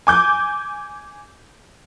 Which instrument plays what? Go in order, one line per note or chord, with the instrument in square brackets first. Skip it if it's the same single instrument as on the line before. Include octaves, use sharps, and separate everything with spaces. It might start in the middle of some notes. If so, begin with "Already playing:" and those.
[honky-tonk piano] G#5 D6 G6